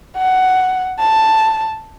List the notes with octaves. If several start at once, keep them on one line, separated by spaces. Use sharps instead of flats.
F#5
A5